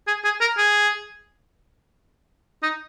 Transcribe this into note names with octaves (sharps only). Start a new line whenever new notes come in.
G#4
G#4
A#4
G#4
D#4